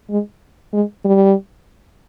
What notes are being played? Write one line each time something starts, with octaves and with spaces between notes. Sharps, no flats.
G#3
G#3
G3